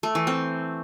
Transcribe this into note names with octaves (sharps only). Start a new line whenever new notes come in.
A3
E3
C4